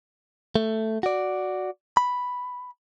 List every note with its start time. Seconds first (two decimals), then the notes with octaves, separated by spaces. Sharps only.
0.55 A3
1.03 F#4 D5
1.97 B5